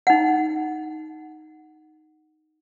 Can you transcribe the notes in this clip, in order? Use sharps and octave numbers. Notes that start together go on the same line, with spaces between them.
D#4 F#5